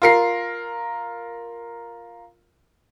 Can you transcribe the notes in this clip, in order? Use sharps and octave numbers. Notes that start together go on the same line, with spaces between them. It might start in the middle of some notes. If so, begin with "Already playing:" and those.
F4 A#4 C7